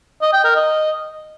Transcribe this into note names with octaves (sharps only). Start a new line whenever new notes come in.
D#5
G5
A#4
D#5